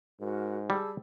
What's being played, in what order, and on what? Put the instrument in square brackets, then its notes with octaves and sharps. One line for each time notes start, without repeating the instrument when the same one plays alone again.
[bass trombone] G#2 [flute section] F#4 A#4
[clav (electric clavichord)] G3 [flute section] G#4 A5 E6